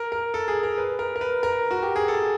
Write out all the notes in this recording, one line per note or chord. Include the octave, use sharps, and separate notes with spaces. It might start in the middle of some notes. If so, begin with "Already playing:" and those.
Already playing: A#4
A#4
A4
G#4
A#4
B4
A#4
A#4
B4
A#4
F#4
G4
G#4
A4